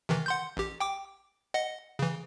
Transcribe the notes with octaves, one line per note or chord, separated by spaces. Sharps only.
C3 D#3 E3
F#5 C6 G6
A1 G4
G5 D6
D#5 F#5
C#3 E3